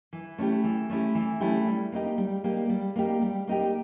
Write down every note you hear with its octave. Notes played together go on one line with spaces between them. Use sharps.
E3
A3 C#4 E4 G4
E3
A3 C#4 E4 G4
E3
A3 C#4 E4 G4
G3
A#3 D#4 G4
G3
A#3 D#4 G4
G3
A#3 D#4 G4
G3
A#3 D#4 G4